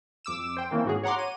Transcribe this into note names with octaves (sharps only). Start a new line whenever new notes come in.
F2 D6 E6 E7
C5 G5
D#3 E3 A#3 C4 C#4
G#2 F#4 G#4
C#5 F#5 A#5 C6 D6
D#7